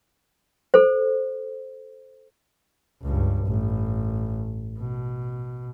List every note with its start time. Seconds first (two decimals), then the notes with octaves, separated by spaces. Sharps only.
0.74 A4 C5
3.02 C#2 G2
3.47 A1
4.79 B2